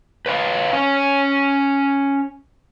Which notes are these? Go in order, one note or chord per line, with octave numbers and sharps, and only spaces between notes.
B4 C#5 F5
C#4 C#5